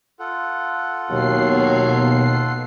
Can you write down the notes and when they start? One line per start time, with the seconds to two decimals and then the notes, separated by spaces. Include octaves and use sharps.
0.19 F4 A4 F#5
1.11 D#2 B2 F#3 C7